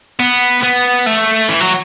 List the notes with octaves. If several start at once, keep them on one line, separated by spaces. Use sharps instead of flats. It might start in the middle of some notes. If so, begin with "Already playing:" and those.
B3
B3
A3
E3
F#3